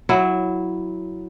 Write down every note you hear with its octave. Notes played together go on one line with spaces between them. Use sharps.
F#3 E4